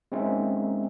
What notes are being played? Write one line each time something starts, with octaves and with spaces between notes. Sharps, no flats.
G#3 A#3 C4 C#4 D#4 E5